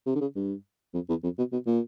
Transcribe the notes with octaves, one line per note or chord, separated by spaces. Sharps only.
C3
D3
C#3
G2
F2
E2
F2
B2
B2
A#2